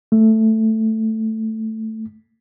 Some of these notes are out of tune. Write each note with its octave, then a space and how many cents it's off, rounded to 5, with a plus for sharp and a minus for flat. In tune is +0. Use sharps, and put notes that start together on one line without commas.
A3 +5